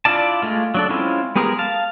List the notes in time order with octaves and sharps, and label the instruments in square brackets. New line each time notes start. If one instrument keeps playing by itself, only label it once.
[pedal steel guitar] D4 E4 F4 D5 A5
G#3 A3 F4
F#3 D4 A4
G#3 C4 C#4 E4 F4
G#3 B3 G4 G#4 A#4
F5 A5